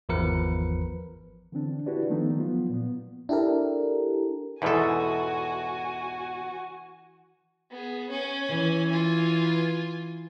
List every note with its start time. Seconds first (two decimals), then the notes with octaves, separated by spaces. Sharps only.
0.09 G#1 E2 F3 A#4 B4 C#7
1.52 D3 E3 C4 D4
1.86 D4 E4 F#4 G4 B4 D5
2.10 D#3 F3 A3 B3 D#4
2.35 F3 F#3 B3 F4
2.69 A#2 B3
3.29 D4 E4 G4 A4 A#4
4.62 E2 G#2 B2 E3 F#4 A4 G#5
7.71 B3 G#4
8.10 C#4 G#5
8.49 E3
8.89 F4 G#5